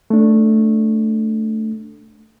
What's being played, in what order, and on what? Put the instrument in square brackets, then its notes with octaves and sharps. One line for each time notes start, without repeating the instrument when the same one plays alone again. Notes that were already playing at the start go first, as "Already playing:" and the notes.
[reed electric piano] A3 D4